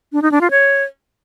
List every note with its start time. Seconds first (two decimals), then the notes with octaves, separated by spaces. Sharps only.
0.13 D4
0.22 D#4
0.32 D4
0.41 F4
0.51 C#5